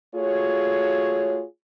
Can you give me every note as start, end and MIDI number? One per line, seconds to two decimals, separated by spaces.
0.15 1.43 57
0.15 1.43 65
0.15 1.43 66
0.15 1.43 68
0.15 1.43 73